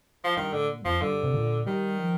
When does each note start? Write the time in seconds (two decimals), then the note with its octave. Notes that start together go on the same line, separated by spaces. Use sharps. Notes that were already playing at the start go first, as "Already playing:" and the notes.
0.24 F3
0.37 G2 D#3
0.53 A2 D3
0.68 A#2
0.81 G2
0.85 F2 F3
1.01 G2 D3
1.23 C3
1.34 A#2
1.66 D#3 G3
1.98 F3